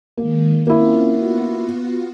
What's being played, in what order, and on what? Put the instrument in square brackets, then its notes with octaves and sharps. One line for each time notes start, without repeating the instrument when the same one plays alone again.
[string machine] D#3 G#3 [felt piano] A#3
[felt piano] A#3 E4 [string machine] C4 C#4 F4
[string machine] B3 F4 F#4